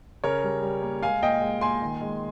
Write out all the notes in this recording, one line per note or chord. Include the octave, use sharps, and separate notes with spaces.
C#3 A#4 C#5
G3
G3
A#3
G#3 F5 G#5
A#2 D#5 G5
G#3
A#2 G#5 C6
D#3
G#3